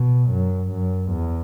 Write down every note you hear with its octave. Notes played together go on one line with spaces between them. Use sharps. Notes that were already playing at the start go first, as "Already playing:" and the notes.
Already playing: B2
F#2
F#2
E2